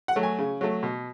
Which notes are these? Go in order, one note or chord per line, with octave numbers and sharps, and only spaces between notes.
F#5
F#3 A3
G#5
C#3
F#3 A3
B2